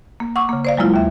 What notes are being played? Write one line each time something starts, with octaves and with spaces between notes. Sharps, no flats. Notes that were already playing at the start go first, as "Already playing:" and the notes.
A#3
F#5 C#6 D6 E6
C#3 A#3
C5 D5 F5
F#3 G#3 A#3 E4 F4
D#2 E5